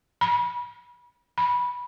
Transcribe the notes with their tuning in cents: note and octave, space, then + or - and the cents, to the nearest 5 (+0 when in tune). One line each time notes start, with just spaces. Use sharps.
B5 -30
B5 -15